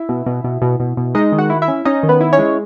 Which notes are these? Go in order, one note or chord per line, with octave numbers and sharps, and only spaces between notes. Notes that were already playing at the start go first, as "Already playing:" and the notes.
Already playing: E4 E5
B2
B2
B2
B2
B2
B2
G#3 D#4 D#5
D#3
F#4 F#5
E4
E4 E5
C#4
C#4 D#4 D#5
D#3
B3 B4
E4
C#4 C#5
G#3